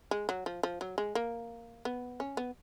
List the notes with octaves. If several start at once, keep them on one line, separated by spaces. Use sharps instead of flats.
G#3
F#3
F3
F3
F#3
G#3
A#3
B3
C#4
B3